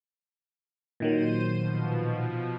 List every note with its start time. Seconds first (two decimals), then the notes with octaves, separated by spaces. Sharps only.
1.00 A#2 D#3 F#3 C5 D#7
1.55 B2 F3